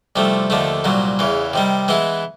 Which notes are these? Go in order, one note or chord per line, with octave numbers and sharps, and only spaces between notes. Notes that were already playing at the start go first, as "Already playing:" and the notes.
C2 C3 F3 A3
D#2 D3 F3 A3
C2 A#2 F#3
E2 C#3 E3
C3 D#3 G3
E3 G#3 B3 E4